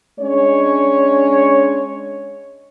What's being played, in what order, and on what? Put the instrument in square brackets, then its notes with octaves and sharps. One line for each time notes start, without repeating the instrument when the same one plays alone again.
[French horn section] G#3 C#4 D4 C#5